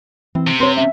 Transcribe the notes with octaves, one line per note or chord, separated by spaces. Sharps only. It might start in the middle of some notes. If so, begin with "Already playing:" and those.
E3 C4
C3
C4 B4 C#5 C6
C#4 E5